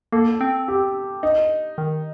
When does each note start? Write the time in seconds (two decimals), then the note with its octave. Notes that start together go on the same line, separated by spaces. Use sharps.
0.12 A#3 A4
0.41 C4
0.68 G4
1.23 D#4
1.78 D#3